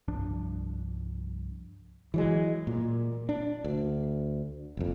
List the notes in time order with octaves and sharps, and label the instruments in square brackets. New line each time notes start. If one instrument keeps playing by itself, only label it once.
[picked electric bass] C2 G2 F3 D4
[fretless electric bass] E3 F#3 G#3
A#2
D4
D2
F#1 F2